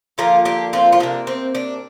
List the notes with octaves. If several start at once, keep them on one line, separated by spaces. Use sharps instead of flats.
D3 F3 A#3 F4 A#4
D4 G4
C4 F4
F4
C3 A#3 D4
C4
D4